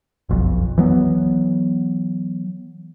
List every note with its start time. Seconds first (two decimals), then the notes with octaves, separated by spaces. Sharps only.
0.29 F#1 B1 F2
0.78 E3 F#3 B3